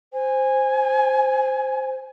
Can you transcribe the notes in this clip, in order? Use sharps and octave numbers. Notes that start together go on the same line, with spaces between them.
C5 G#5